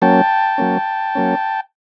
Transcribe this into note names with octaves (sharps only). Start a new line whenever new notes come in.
F#3 A#3 C#4 G5 A5
F#3 A#3 C#4
F#3 A#3 C#4